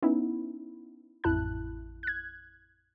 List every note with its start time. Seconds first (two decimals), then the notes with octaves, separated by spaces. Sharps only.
0.02 B3 C#4 D#4 E4
1.24 A1 F2 E4 A5 F#6
2.03 F#6 G#6